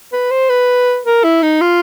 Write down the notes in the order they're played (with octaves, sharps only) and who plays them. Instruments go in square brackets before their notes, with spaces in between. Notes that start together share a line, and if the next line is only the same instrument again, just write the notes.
[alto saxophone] B4
C5
B4
A#4
E4
D#4
F4